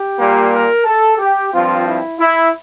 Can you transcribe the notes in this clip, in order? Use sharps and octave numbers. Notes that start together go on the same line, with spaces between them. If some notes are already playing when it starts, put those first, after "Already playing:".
Already playing: G4
A#2 G3 A#3
A#4
A4
G4
G2 F3 C4 F4
E4
E4